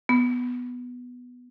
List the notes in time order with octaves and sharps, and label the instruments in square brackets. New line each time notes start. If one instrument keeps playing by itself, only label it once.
[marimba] B3